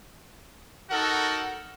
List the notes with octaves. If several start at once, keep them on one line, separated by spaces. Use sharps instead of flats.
D#4 F#4 A4 A#4 F#5